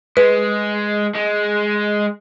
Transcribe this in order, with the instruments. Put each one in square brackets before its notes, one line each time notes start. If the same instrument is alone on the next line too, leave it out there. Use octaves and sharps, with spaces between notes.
[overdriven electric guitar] G#3 [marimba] B4
[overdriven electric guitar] G#3